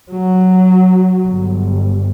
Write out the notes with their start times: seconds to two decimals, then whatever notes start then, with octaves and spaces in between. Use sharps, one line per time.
0.11 F#3
1.28 G1